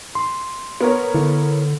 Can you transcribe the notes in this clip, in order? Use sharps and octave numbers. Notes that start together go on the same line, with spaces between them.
C6
B3 A#4 C#5
D3 E4